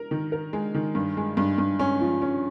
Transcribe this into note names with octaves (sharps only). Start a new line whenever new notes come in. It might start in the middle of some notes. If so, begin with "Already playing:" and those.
Already playing: A#4
D#3
A#4
G#3
D#3
G2
G#3
G2
G2
C#4
F3
C#4